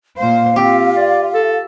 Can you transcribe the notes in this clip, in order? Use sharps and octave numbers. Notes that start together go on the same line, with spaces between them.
A#2 C5 F5
C4 F4 G4
D5
A4